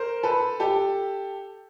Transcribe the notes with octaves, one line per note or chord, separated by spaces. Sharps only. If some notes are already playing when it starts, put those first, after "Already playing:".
Already playing: A#4 C5
A4 B4
G4 A4